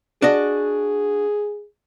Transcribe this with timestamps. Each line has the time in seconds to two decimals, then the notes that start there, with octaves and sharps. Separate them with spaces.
0.22 D4 F#4 G#4 D#5